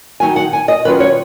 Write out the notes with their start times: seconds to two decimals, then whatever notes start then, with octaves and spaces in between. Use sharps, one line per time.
0.20 D#3 F#3 A#3 D#4 G#5
0.36 F#5
0.53 G#5
0.68 D#5
0.85 D#3 F#3 C#4 F4 B4
1.00 C#5